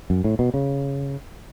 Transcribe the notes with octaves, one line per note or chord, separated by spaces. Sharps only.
F#2
A2
B2
C#3